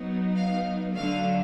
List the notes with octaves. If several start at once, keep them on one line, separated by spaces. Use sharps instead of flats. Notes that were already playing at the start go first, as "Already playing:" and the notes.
Already playing: F#3 B3 D#4
F5
D3 F#3 A3 D4 F5